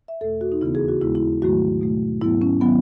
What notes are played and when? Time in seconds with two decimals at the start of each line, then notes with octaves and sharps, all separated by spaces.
0.08 E5
0.21 E2 B2 A3 A4
0.41 F#4
0.52 D#4
0.61 D#2 C#3 E3 B3 E4
0.75 G#4
0.88 F#4
1.02 D#2 C#3 G#3 B3 E4
1.15 E4
1.42 G#2 D#3 F#3 A3 F#4
1.81 B2 A3
2.21 G#2 F#3 B3 E4
2.42 C#4
2.61 D#3 F#3 B3